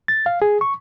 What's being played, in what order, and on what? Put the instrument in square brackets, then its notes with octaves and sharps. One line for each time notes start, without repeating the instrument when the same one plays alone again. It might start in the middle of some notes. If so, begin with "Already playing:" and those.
[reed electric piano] A6
F5
G#4
C#6